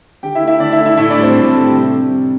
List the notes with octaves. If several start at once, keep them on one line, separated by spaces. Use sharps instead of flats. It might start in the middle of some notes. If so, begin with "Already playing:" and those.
D3 G4 G5
E4 E5
A3
E4 E5
D3 D4 D5
E4 E5
A3
E4 E5
A2 E4 E5
D4 D5
G3
C4 C5
A2 A4
A4
G3
G4
C3
G3
C3